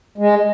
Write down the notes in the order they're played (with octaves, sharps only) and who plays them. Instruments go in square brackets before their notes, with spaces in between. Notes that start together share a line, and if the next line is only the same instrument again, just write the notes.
[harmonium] G#3